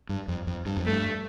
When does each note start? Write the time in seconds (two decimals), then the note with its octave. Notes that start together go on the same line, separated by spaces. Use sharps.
0.09 G2
0.28 F2
0.47 F2
0.66 G2
0.77 F2
0.85 G2 A3